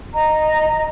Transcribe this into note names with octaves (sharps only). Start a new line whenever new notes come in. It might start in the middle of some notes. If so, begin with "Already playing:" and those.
D#5 A#5